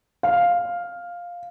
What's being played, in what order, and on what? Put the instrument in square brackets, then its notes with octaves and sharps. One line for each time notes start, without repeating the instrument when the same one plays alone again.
[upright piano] F5